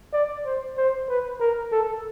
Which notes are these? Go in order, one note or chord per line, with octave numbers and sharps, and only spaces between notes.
D5
C5
C5
B4
A#4
A4